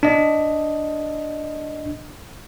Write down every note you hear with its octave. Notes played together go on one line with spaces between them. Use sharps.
D4 D#5